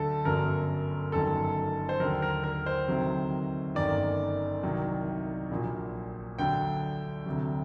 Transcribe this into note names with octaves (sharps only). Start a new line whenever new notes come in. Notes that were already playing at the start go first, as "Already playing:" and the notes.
Already playing: D2 D3 F#3 A4
G1 F#2 D3 F#3 A#4
G1 F#2 D#3 F#3 A4
C5
D#2 D3 F#3 A#4
A#4
A#4
C5
D2 C3 D#3 F#3
G1 F#2 D#3 D5
C2 C3 D#3 F#3
A#1 A#2 F#3
D2 D3 F#3 G5
D2 C3 F#3